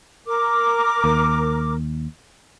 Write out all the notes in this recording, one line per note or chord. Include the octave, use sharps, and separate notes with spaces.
A#4 D6
D#2